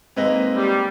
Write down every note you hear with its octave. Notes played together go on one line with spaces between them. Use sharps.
G#2 G#3 A#3 C4 B4 D#5
G3